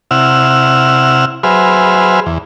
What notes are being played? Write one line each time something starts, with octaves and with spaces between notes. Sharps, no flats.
C3 E4 F#5 E6 F6
F#3 G#4 B4 C5 E5 F6
E2